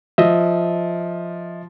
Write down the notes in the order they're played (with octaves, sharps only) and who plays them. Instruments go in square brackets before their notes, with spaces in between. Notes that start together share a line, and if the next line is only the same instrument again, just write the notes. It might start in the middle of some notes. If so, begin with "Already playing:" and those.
[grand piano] F3 [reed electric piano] D#5 E5